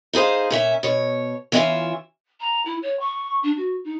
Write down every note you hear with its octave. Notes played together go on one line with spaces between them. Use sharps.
D#4 E4 G#4 C5 F5
A#2 C#4 E5
B2 C#5
E3 C#4 D4 E4 F4 E5
A#5
E4
C#5
C#6
D4
F#4
D#4